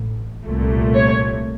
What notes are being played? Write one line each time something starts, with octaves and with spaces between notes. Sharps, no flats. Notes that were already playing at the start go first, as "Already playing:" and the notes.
Already playing: A1
C2 A#2 A3
C#5